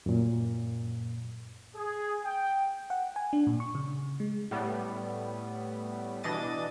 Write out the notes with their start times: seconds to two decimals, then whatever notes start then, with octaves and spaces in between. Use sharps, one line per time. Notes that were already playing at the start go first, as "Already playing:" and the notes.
0.06 F#2 A#2
1.76 G#4
2.24 G5
2.90 F#5
3.16 G#5
3.33 D4
3.47 A#2
3.60 C#6
3.75 C#3
4.20 G#3
4.51 A2 G3 B3
6.23 B2 E3 D4 D#5 A6 D#7